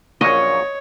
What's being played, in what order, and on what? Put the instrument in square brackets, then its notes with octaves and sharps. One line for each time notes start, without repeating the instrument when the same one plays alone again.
[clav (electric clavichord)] A#1 F#2 A#2 [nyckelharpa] C#5 [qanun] D#5 [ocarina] C#6